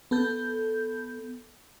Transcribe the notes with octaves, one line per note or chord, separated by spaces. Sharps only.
B3 A4 G6